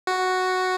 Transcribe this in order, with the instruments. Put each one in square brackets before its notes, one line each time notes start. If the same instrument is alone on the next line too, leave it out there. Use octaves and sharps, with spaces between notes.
[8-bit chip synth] F#4